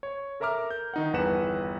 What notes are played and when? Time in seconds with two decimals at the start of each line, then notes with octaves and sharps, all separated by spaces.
0.03 C#5
0.40 A4 A#4 E5 A#5 D6 F6
0.71 G6
0.94 D#3 D#4 F#5
1.13 G1 E2 B4 F#5 E7